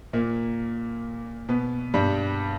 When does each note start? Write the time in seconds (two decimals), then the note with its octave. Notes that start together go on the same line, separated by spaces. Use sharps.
0.13 A#2 A#3
1.48 B2 B3
1.94 G2 G3